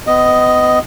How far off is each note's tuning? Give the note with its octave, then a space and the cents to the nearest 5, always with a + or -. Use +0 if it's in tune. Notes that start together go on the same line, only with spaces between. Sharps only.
B3 +35 D#5 +0